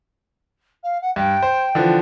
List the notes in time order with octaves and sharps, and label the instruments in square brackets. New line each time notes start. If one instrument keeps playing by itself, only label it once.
[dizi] F5
F#5
[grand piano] G2 [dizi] G5
[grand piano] C5
D3 E3 F3